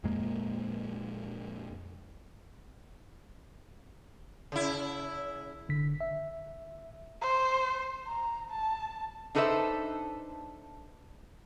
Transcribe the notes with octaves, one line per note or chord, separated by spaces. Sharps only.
F2 A#2 G#3 A#3
C#3 E4
G1 D3 B6
E5
C5
A#5
A5
D4 D#4 A4 B4 C5 E5